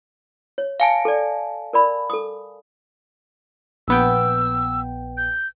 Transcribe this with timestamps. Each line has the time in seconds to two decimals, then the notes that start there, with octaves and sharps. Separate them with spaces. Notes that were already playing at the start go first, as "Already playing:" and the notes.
0.58 C#5
0.80 F5 G#5 A5
1.05 A4 D5
1.73 A#4 D5 B5
2.10 A4 D#6
3.88 A#1 B3 G5 E6
5.17 G6